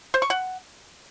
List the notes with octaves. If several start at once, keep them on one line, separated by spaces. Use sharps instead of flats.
C5
C#6
F#5